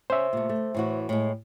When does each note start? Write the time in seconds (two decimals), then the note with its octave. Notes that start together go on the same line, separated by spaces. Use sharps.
0.10 C#4 C5 E5
0.33 A#2 A3
0.49 A3
0.75 A2 E3 F#4
1.09 A2 G#3